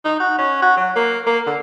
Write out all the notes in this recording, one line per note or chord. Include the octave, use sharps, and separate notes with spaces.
D#4
F#4
C#4
F#4
F#3
A#3
A#3
D3